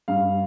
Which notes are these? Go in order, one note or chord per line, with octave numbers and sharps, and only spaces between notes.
G2 F5